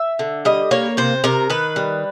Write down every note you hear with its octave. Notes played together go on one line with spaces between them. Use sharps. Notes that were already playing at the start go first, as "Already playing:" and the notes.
Already playing: E5
D3
G3 D#5
A#3 C#5
C3 C5
C3 A#4
D#3 B4
G3